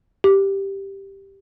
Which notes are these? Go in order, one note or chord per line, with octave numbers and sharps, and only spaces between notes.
G4